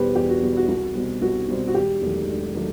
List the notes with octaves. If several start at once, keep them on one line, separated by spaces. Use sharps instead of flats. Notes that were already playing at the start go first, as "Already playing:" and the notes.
Already playing: E2 B2 G3 G4 B4 C5
E2 G4
F#4
B2 G3
F#4
C2
B2 G3 C4
C2 F#4
B2 G3 C4
F#4
E1 G4
E2 D#3 F#3 A3
E1
D#3 F#3 A3